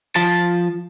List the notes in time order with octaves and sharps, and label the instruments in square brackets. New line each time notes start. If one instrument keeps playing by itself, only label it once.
[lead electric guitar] F3 A5